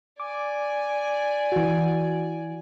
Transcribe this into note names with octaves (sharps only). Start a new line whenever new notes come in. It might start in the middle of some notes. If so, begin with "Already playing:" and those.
D5 G#5 D6
E3 F#4